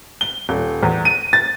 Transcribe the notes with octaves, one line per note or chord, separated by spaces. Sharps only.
G7
D#1
E2
D#7
A6